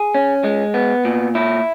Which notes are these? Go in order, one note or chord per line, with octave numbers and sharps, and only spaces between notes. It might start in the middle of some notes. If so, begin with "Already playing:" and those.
Already playing: G#4
C#4
G#3
B3
A#2
E4